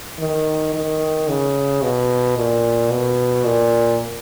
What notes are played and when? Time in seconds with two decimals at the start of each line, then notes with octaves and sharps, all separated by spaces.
0.19 D#3
0.74 D#3
1.28 C#3
1.82 B2
2.37 A#2
2.91 B2
3.45 A#2